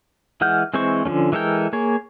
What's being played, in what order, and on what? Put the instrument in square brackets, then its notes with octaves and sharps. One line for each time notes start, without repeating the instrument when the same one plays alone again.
[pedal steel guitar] E3 G#3 F#5 F6 G6
E3 G#3 C4 C5 C#6
D3 F3 A3 C#4
E3 G#3 A4 A#4 G5
A#3 G#4 C#5